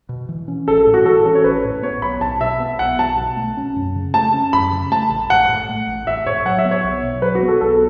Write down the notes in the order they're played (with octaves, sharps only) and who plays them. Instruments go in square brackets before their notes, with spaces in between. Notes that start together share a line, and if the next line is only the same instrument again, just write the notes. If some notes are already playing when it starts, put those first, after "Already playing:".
[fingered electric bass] B2
E3
C#4
[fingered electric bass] A1 [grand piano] A4
[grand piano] A4
[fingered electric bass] A2
[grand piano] F#4
[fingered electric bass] E3 [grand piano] A4
[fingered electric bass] C#4 [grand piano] A4
[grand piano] C#5
[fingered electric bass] A1 [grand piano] B4
[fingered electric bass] A2
[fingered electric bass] B3 [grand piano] C#5
[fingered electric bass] B1 [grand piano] B5
[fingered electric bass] B1 [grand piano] A5
[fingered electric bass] B2 [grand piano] E5
[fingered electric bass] B3
[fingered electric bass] B1 [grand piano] F#5
[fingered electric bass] B1 [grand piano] A5
[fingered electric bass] B2
A3
C#4
F#2
C#3
[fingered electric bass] A3 [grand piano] A5
[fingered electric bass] C#4
[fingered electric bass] F#2 [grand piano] B5
[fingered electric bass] C#3
[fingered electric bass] A3 [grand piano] A5
[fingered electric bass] A1
[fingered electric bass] A1 [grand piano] F#5
[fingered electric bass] A2
A3
A1
[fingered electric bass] A1 [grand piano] E5
[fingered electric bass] A2 [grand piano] C#5
[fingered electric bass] F#3 [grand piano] F#5
[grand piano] E5
[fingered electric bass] B3
[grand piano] C#5
[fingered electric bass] B1
B2
[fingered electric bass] F#3 [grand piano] B4
[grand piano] F#4
[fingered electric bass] B3
[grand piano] A4
[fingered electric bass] B1 [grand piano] A4